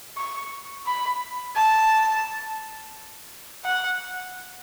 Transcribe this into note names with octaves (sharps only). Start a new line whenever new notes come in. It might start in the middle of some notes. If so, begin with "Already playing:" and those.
C#6
B5
A5
F#5